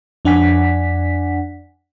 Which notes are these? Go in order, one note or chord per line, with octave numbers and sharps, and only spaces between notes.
F2 D4 D5 F#5 G#5 B6